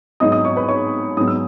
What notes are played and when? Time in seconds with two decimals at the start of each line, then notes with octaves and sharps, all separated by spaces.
0.20 G#2 F#3 B3 D#5 D#6
0.32 D#5 D#6
0.45 C#5 C#6
0.57 B4 B5
0.68 C#5 C#6
1.17 G#2 F#3 B3 D#6
1.27 E6